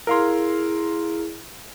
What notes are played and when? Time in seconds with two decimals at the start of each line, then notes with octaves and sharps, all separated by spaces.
0.07 E4 G#4 A#4 F5 C6